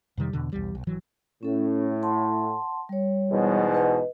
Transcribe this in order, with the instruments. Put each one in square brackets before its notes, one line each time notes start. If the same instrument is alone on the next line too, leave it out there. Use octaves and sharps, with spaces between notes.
[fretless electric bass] F2 C3 D#3 G3
E2 B2 D3
B1 E2 G3
B1
G#1 E3 F#3
[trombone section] A2 [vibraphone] C#4 A4
[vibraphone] F#5 A5 C6
G3 C#5
[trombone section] E2 G#2 B2
[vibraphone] B4 D#5